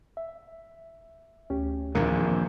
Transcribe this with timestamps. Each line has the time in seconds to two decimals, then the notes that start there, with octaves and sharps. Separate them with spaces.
0.17 E5
1.50 D2 C#4 G4
1.95 A#1 E2 A2 C3 D#3 A#3